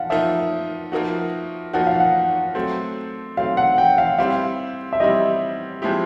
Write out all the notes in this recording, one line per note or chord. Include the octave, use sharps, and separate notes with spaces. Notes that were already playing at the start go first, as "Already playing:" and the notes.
Already playing: F3 F5 F#5
F3 A#3 D#4 E5
F3 A#3 D#4 F#4
F3 A#3 D#4 F#4 F#5
F5
F#5
F#3 A3 C4
F#3 A3 C4 F5
F#5
G5
F5
G3 C4 E4 G4 F5
E5
G3 C4 E4 G4 D#5
F3 G#3 C4 E4 G4